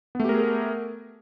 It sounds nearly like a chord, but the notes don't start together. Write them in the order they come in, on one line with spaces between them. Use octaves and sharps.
B3 A3 G4 A#4 G#4